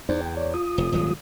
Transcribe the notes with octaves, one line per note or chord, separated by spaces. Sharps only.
E2 D#4 C5 D5
G5
C#5 D5
F4 D#6
F1
D#1 G#1 F#3